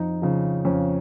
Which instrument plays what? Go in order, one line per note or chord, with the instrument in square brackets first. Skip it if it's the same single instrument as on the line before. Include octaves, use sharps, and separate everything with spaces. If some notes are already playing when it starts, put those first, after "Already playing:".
Already playing: [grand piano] F2 D#4
C#3 F3
F2 C#4